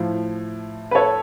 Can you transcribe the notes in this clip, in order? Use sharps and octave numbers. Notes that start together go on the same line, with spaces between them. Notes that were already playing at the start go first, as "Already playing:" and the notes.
Already playing: A2 F3
B4
A4 C#5